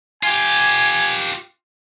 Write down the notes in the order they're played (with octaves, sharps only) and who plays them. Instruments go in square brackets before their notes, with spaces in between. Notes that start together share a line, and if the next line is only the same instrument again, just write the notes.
[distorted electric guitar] F4 G4 [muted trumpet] G#5